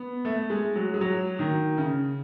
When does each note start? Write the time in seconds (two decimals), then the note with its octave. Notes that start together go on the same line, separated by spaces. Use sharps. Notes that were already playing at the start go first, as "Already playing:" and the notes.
Already playing: B3
0.25 A3
0.50 G#3
0.76 F#3
0.94 G#3
1.01 F#3
1.39 D#3
1.77 C#3